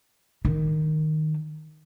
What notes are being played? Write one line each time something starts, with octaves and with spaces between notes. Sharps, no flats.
D#3